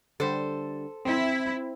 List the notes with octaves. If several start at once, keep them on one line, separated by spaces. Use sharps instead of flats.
D3 G3 A4 C5
C4 E4